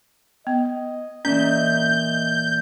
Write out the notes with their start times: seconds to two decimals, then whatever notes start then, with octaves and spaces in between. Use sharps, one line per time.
0.47 B3 D#5
1.25 A#2 E3 C#4 G6